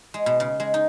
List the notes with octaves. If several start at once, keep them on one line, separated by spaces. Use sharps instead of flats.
G#3
B2
C#3
G#3
D#4